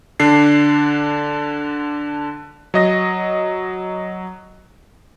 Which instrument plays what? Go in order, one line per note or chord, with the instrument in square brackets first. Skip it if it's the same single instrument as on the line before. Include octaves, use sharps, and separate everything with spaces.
[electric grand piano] D3 D4 C7
F#3 D#5 A#6